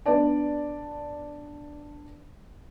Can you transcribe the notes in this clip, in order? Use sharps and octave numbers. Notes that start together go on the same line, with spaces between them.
B3 D4 B4 D5 A5